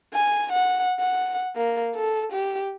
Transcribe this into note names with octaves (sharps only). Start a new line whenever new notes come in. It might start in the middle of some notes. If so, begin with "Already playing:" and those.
G#5
F#5
F#5
A#3
A4
G4